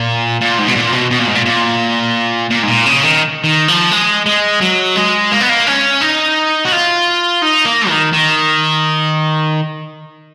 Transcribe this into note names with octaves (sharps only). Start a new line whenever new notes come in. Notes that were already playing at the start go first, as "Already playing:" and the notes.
Already playing: A#2
A#2
G#2
B2
A#2
B2
B2
A#2
G#2
A#2
A#2
A#2
G#2
A#2
C#3
D#3
D#3
F3
G#3
G#3
F#3
G#3
A#3
B3
A#3
C#4
D#4
F#4
F4
D#4
A#3
D#3
D#3